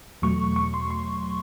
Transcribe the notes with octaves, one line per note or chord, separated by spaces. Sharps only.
E2 B2 F#3 A3 C#6
C#6
C6
C6